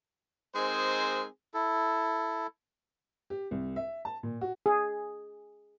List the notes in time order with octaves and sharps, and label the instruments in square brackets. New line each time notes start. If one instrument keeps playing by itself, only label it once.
[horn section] G#3 C4 D#4 G#4 A#4 C5
[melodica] E4 A4
[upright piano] G4
C2
E5
A5
A#2
F#4
[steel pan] G#4